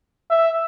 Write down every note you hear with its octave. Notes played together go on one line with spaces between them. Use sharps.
E5